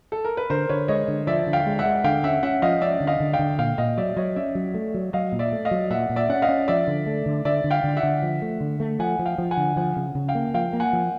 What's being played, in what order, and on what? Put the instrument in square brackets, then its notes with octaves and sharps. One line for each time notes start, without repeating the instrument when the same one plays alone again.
[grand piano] A4
A#4
B4
[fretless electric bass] D3 [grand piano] A#4 C5
[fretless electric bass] D3 [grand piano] B4 C#5
[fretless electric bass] G#3 [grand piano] C#5 D#5
[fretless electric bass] D3
[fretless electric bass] F3 [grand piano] D5 E5
[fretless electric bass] D3
[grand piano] F5 G5
[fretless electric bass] G#3
[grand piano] E5 F#5
[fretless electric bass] G#3
[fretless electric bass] D3 [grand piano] F5 G5
[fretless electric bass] C#4 [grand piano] E5 F#5
[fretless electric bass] C#4 [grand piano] E5 F#5
[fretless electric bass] F3 [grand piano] D#5 F5
[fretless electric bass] C#4 [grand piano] D5 E5
[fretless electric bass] D3
[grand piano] D#5 F5
[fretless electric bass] D3
[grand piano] F5 G5
[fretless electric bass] D3
[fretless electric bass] A#2 [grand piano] F5 G5
[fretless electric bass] A#2 [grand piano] D#5 F5
[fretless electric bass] F#3 [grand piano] D5 E5
[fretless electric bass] F#3 [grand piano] C#5 D#5
[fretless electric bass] C#4 [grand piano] D5 E5
[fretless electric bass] F#3
A3
F#3
[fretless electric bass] F#3 [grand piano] D#5 F5
[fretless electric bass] A#2
[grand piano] D5 E5
[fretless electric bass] A3
[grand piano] D#5 F5
[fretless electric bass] F#3
[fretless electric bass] A#2 [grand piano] E5 F#5
[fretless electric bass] A#2
[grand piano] D5 E5
[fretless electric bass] C#4 [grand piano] F#5
[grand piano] D#5 F5
[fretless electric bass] C#4
[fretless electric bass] F3 [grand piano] D5 E5
[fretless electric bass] D3
A3
D3
[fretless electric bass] D3 [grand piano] D5 E5
[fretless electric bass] D3
[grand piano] F5 G5
[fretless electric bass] D3
[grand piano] E5 F#5
[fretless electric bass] D3
F3
A3
D3
A3
[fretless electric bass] F3 [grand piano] F#5 G#5
[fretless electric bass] F3
[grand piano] F5 G5
[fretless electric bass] F3
[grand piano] F#5 G#5
[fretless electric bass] D3
[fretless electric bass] F3 [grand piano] F#5 G#5
[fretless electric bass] C#3
C#3
[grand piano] F5 G5
[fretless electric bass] A#3
[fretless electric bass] F3 [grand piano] F5 G5
[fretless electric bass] A#3
[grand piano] F#5 G#5
[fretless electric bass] F3